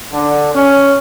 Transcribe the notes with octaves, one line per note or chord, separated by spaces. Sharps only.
D3
C#4